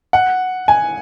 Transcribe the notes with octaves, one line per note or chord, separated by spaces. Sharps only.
F#5
G#5